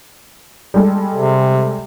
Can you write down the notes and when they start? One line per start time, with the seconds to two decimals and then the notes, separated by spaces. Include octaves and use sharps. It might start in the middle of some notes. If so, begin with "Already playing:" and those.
0.74 G3 G#3 A4
1.16 C3